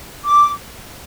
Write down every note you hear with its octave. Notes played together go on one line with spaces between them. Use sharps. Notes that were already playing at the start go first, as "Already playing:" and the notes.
D6